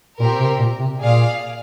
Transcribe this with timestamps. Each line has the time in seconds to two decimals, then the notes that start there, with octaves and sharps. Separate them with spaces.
0.19 A#2 C4 G4 A#4
0.40 C3
0.59 A#2
0.80 C3
0.99 A#2 G#4 D5 F5